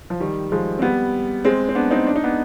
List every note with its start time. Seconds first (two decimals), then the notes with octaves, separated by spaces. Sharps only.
0.10 F3
0.20 D#3 G3
0.52 F3 G#3
0.79 C4
0.82 G3 B3
1.45 G#3 C4
1.69 C4
1.75 B3 D4
1.91 C4 D#4
2.07 D4
2.16 D#4
2.24 B3 D4